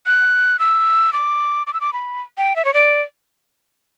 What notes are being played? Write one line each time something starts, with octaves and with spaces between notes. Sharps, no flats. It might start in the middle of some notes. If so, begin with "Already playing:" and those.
F#6
E6
D6
D6
E6
D6
B5
G5
E5
C#5
D5